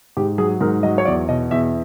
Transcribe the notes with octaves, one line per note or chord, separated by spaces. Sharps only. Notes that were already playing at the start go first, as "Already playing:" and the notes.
G#2 G4
F#3 G#4
G#2 A#4
F#3 D#5
C#5
E2 D5
B2 D#5
E2 E5